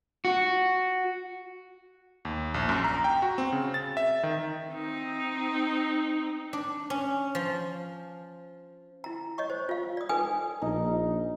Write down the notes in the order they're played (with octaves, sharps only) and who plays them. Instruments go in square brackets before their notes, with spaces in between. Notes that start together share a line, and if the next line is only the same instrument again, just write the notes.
[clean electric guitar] F#4
[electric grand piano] D#2
A#1
F#2
A#5
G5
F#4
C4
C#3
A6
E5
D#3
[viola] C4 D#4
[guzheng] D4
C#4
F3
[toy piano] E4 A#5
C#5 D#5 C#6
C5
F4 F5
D5 D#6
D#4 A4 B4 G#5 D#6
[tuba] A#1 [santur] D#4